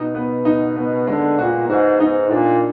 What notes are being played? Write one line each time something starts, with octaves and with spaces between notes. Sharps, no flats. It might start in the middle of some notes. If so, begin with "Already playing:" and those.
Already playing: B2 D#4
B3
D#4
B3
D3 G#3
A#2 F#4
G#2 F#4
G#2 D#4
A#2 D4